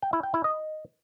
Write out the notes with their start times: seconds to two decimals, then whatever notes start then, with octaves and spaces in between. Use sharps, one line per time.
0.02 G5
0.13 E4
0.23 G5
0.34 E4
0.44 D#5